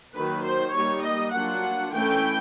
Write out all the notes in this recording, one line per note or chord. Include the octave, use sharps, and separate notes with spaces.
D#3 F#3 A#3 B4
C5
G3 A#3 D#4 C#5
D#5
F#3 A#3 D4 F4 F#5
E3 A3 C#4 E4 G5